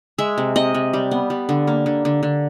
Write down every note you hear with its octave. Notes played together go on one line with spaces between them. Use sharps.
G#3 E5
C3
C3 D#5
C3
G3
B3
G3
D3
A#3
D3
D3
D3